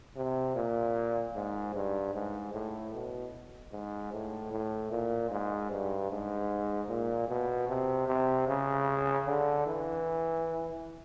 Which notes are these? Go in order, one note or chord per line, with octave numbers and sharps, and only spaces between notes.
C3
A#2
G#2
G2
G#2
A2
B2
G#2
A2
A2
A#2
G#2
G2
G#2
A#2
B2
C3
C3
C#3
D3
E3